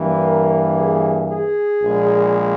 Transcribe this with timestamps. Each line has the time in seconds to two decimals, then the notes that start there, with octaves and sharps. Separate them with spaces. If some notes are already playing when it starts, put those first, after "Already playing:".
Already playing: G2 E3 A#3
0.26 A#4
0.78 G#4
1.30 G#4
1.82 A#1 A#2 G#3